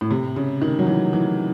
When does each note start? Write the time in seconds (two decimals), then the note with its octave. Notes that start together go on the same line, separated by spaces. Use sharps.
0.01 A2
0.11 C3
0.36 C#3
0.62 D#3
0.79 F#3
0.87 E3
1.13 E3